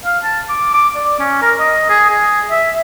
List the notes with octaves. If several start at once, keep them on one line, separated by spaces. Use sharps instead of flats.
F5
A5
D6
D6
D5
C#4
A#4
D#5
G#4
G#4
E5